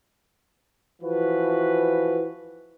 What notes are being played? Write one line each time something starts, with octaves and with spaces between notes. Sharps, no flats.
E3 F3 F#4 B4